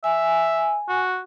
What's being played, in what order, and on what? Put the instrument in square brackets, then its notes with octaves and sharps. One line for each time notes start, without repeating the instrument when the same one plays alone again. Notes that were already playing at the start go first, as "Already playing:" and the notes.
[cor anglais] E5 [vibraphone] G#5
[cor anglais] F#4